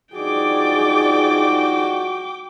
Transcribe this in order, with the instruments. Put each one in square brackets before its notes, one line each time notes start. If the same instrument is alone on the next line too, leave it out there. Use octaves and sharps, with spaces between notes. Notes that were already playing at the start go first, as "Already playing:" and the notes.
[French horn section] G2 F3 D#4 [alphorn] F#4 [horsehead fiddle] G#4 D5 [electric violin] G5 D6